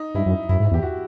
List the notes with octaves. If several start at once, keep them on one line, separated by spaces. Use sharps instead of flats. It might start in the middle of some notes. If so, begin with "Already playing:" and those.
Already playing: D#4
G2 E4
F#2
F#2 E4
G#2
E2 G4
F#4